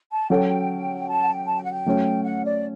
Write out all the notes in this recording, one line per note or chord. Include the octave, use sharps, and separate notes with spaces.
A5
F#3 C#4 F#4 A4 G5
A5
F#5
G5
A5
G5
F#5
G5
F#3 A3 C#4
F#5
D5